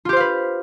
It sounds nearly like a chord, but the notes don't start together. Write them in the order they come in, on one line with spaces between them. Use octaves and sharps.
F4 G4 C5 F5 B4